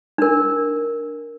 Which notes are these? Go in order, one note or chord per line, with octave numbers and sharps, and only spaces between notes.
D4 A#4